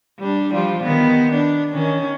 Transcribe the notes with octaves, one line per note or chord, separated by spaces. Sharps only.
G3 D4
F3 G3 F4
D#3 B3
D4
D#3 C#4